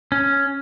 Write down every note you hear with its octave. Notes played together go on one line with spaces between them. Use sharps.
C#4